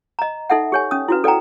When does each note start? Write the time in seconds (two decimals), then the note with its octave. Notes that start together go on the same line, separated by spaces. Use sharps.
0.19 D#5 A#5
0.50 D#4 A4 E5 F#5
0.72 G4 C#5 G#5
0.91 C#4 D#6
1.08 E4 F#4 B4
1.24 A4 D5 F#5 G5 A#5